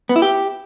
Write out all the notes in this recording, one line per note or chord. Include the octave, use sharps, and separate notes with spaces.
B3
E4
G4